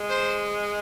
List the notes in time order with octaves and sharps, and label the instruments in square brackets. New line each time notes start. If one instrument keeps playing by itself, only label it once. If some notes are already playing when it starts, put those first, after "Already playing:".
Already playing: [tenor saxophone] G#3
[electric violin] C5